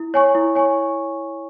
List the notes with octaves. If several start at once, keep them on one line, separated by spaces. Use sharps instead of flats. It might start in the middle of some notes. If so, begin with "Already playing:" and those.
Already playing: E4
C#5 G#5 C#6
E4
C#5 G#5 C#6